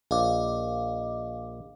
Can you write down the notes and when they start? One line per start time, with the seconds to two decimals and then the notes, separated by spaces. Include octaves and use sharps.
0.11 A#1 D#5 F5 D6